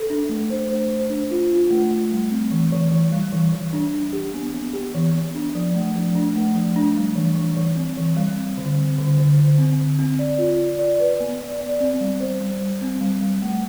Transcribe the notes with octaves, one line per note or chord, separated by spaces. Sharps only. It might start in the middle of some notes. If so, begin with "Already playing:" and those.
Already playing: A4
D4
A3
C5
C5
C5
D4
F4
F4
A3
A3
G3
C4
E3
E3
E3
G3
E3
E3
D4
D4
G4
B3
B3
G4
E3
B3
D4
F3
A3
F3
D4
A3
F3
D4
G3
E3
E3
E3
C4
E3
G3
C4
D3
C4
D3
D3
D3
C4
D3
C4
D5
F4
D5
D5
B4
B3
D5
D5
C4
G3
C5
G3
G3
C4
G3
G3
A3